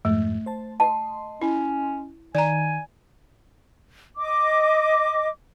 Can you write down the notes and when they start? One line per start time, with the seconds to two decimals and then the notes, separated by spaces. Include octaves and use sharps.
0.05 F2 G#2 A3
0.46 C5 A5
0.80 D#5 A5 C6
1.42 C#4 E4
2.35 D#3 D5 G#5 A#5
4.17 D#5 D6